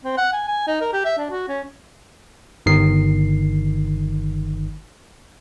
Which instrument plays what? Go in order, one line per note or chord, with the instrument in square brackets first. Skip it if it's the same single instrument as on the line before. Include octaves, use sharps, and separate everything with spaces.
[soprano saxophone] C4
F#5
G#5
G#5
D#4
A#4
G4
E5
D4
F#4
C#4
[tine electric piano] G1 D#3 C7